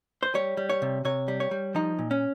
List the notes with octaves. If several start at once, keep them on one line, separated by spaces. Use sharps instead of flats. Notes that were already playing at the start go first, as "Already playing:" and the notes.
C5
G3 C#5
G3
C#5
C3
C3 C#5
G3
C#5
G3
F3 D#4
A#2
C#4